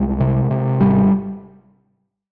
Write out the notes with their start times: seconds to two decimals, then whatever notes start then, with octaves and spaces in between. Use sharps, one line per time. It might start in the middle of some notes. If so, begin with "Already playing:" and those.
Already playing: C2 G#3
0.20 C3
0.51 C3
0.80 G#1 G3